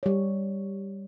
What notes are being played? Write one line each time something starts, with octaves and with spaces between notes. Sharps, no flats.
G3 C#5